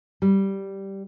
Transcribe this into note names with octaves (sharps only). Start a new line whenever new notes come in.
G3